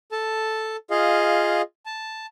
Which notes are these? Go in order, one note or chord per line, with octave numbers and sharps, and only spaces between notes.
A4 A5
F4 G#4 D#5 F5
A5